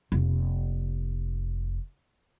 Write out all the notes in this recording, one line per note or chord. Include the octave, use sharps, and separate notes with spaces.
F1 A#3